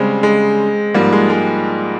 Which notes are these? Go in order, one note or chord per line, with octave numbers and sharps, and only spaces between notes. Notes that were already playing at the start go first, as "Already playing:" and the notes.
Already playing: C#3 G3 G#3 C4 C#4
G#3
G#2 F3 G3 A#3
G#3
G#3